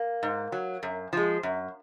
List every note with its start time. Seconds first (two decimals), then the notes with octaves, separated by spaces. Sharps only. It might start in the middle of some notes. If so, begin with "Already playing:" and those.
Already playing: A#3
0.23 G#2
0.52 F#3
0.83 F#2
1.13 F3 G#3
1.43 F#2